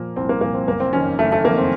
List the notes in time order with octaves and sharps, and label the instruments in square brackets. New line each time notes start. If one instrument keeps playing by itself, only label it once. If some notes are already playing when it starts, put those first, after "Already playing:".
Already playing: [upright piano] A#2 F3 A#3
C2 C4
A#3
A#2 F3 A#3
C4
F#1 A#3
C4
F2 D#3 C#4
F#1 A3
A3
D#3 A#3
F2
C4